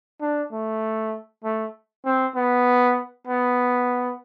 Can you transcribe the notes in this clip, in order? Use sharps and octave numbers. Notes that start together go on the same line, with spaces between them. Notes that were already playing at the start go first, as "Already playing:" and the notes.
D4
A3
A3
C4
B3
B3